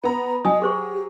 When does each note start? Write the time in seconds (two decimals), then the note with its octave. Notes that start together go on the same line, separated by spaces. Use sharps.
0.04 B3 A#5 B5
0.45 F#3 D#5 G#5 D#6
0.62 G4 G#4 C5 C#6